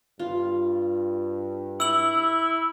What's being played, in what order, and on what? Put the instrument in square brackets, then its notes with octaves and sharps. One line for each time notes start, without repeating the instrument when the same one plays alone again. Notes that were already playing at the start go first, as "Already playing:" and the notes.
[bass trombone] G2 [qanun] F4
[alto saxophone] E4 [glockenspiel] E6 F#7